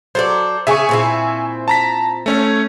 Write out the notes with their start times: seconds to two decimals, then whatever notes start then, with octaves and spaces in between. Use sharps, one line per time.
0.15 F#3 A4 C5 D5
0.67 C#3 G#4 E5 G#5 C#6
0.89 A#2 C4 E4
1.68 A5 A#5 B6
2.26 A3 C#4 C#5